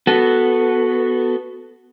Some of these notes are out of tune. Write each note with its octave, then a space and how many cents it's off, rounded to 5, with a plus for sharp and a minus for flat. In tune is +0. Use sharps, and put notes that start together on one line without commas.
B3 +0 F#4 +0 A4 +0